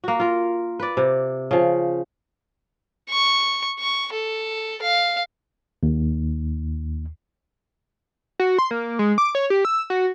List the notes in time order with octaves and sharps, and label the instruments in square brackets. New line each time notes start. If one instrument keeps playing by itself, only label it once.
[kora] A#3 F#4
F4 A#4
B4 D5
C3
C#3 F3
[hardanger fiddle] C#6
C#6
A4
F5
[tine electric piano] D#2
[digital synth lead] F#4
C6
A#3
G#3
D6
C#5
G4
E6
F#4